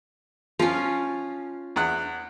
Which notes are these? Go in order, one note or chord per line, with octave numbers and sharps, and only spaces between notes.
F3 C#4 F4
E2 F#5